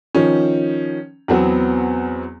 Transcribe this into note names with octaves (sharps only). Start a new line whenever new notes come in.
D#3 F3 C#4
E2 F#3 B3 C4